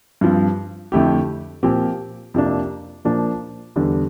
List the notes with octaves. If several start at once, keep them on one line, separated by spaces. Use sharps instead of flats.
G2 F3 C4
F2 D3 A3 E4 G4
A#2 F3 C4 G4
F2 C3 F3 A#3 D4
A#2 F3 A#3 D4
E2 D3 G3 D4